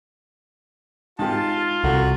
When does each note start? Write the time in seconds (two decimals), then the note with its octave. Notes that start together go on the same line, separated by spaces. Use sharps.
1.19 G#2 F4 G4 A5
1.84 C2 F#4 A4